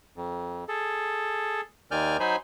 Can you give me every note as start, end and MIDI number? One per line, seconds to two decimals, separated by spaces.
0.16 0.64 41
0.68 1.61 68
0.68 1.61 69
1.91 2.17 39
1.91 2.17 51
1.91 2.17 74
1.91 2.17 80
1.91 2.17 89
1.91 2.17 91
2.20 2.36 54
2.20 2.36 63
2.20 2.36 72
2.20 2.36 80
2.20 2.36 83